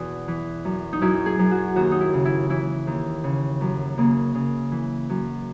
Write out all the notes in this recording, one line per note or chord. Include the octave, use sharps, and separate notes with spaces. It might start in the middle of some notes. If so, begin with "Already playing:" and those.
Already playing: E2 B2 E4 F#4
E3
F#2
D#4
F#2 E4
G#4
F#2
F#4
D#2 F#4
D#4
E4
C#3
E4
E3 E4
D#2
C#3
F#2
C#3 A#3
C#3
E3
F#2